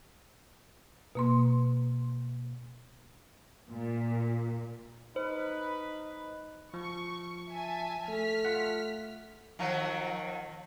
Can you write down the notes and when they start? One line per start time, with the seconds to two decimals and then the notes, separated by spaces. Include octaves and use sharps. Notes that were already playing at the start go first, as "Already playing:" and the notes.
1.15 B2 A#3 C6
3.69 A#2
5.16 D#4 B4 C5
6.74 F3 C#6
7.50 E5 G#5 A5
8.09 A3 F6 B6
8.45 F4 F#5
9.59 D#3 F3 F#3